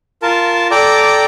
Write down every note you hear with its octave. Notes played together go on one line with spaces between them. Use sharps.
F4 A#4 A5
A4 D5 G5 A#5 D6